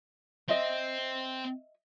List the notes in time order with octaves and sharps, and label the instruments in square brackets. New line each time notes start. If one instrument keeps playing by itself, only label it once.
[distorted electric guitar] C4 [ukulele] D#5 E5